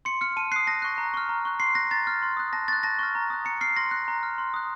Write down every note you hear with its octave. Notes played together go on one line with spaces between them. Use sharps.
C6 C#7
F6 C#7
A5 D#7
D#6 F#6 C7
A5 A#6
C#6 F#6
A#5
C#6 F6
A#5
C#6 F#6
C6 C7
F#6 A#6
A#5 A6
F6
C6
D#6 F#6
A5 A#6
C#6 F#6 A6
A5 A#6
C#6 F6
A#5
D#6 F#6
A#5 C#7
F6 C7
C6 A#6
F#6
A#5
F6
C6
D#6 F#6